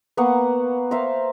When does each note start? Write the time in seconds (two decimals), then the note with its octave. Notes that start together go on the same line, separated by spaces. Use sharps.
0.17 A#3 B3 F#5 C#6
0.91 A#4 C5 E5 F5